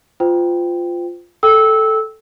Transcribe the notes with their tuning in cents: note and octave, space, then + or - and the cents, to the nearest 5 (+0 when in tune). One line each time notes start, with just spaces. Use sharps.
F4 +0 C5 -35 G5 +0
A4 +0 G5 +0 E6 -15